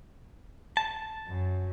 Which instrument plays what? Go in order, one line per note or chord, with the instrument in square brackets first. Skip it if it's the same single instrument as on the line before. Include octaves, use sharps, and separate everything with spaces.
[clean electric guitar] A5
[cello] F#2